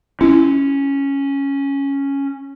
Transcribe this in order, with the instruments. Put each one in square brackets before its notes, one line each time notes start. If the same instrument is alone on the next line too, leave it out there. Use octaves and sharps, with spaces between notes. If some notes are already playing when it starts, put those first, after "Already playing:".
[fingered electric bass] C#4 [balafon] E4